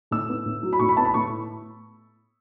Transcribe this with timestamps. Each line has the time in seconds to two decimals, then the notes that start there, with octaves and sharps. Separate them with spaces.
0.11 A2 E6
0.29 B3
0.46 A2
0.63 F#3
0.73 B5
0.79 A2 C#6
0.89 B5
0.97 B3 A5
1.05 B5
1.14 A2 C#6